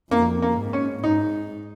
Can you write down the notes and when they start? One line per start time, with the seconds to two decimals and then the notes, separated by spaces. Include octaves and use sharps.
0.11 F2 A#3
0.42 A#3
0.58 G#2
0.73 C#4
1.04 G#2 D#4